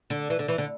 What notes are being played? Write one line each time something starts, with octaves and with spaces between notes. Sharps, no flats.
D3
E3
D3
E3
D3